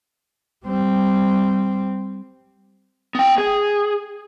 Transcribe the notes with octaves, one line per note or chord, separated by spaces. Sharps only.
G3 C4
B3 G5
G#4